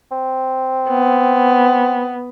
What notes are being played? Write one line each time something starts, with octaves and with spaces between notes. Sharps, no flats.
C4
B3